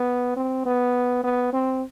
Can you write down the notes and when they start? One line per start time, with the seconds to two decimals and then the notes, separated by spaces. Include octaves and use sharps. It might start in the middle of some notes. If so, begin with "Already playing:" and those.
Already playing: B3
0.36 C4
0.65 B3
1.23 B3
1.53 C4